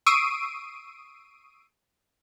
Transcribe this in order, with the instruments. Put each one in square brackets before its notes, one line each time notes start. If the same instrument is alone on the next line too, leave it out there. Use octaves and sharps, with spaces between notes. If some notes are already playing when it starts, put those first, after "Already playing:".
[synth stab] C#6 D#6 E6 C7 D7 D#7